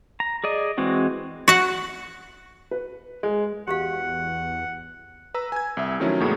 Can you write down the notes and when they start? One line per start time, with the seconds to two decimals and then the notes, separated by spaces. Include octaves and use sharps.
0.20 A#5
0.44 G#4 D5 D#5
0.78 E3 G#3 C4 F#4
1.48 F#4 F#5
2.71 B4
3.23 G#3
3.68 E2 F#4 G4 F5 F#5
5.34 B4 A#5 E6
5.52 G#5 G#6
5.77 C2 E5
6.00 D#3 F3 F#3 A3 C#4 E4
6.20 E2 A2 C#3 F#3 G#3 A#3